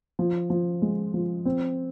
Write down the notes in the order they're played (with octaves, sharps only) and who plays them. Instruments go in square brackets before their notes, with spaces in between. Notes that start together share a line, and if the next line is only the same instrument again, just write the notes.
[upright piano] F3
F3
G#3
F3
C4